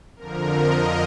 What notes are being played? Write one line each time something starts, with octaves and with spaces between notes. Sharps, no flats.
F2 D3 F3 A#4
D#5